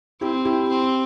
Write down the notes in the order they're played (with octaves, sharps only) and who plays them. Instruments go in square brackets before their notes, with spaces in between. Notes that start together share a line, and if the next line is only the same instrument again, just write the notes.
[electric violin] C4 [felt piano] E4 G4
[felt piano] E4 G4
[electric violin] C4